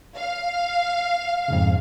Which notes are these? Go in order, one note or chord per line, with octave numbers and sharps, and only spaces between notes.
F5
F2 G#2 C#3